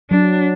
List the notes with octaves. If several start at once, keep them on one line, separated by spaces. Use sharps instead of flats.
F#3 D4